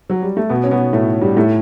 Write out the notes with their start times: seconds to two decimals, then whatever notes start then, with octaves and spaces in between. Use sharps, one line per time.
0.10 F#3
0.22 G3
0.37 A3
0.50 B2 B3
0.64 C#4
0.71 B2 B3
0.93 A2 A3
1.21 G2 G3
1.36 A2 A3